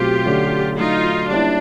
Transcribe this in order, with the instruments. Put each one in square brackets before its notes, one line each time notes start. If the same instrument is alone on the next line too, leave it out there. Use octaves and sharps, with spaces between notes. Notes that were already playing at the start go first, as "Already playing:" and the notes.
Already playing: [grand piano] B2 F#3 A3 C4 [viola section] F4 G4
[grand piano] D3 F#3 A3 C#4 F#4
[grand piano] D3 F#3 A3 [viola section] D#4 F4
[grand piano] G3 A#3 C#4 E4 G4 [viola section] D4